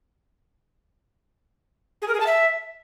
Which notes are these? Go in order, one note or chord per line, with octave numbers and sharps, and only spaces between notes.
G#4
A#4
G#4
A5
E5